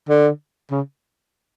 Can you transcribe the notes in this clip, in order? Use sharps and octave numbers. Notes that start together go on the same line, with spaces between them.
D3
C#3